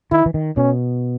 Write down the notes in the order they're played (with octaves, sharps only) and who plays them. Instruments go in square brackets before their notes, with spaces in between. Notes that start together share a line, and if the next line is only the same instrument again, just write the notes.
[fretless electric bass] D#3 [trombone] E4
[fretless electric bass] E3
D#3
[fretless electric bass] B2 [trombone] C#4